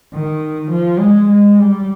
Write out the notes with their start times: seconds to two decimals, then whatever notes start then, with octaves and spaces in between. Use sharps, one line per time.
0.14 D#3
0.70 F3
0.99 G#3
1.29 G#3
1.58 G3